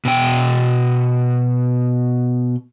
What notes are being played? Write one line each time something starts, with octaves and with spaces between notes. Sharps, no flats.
B2 G5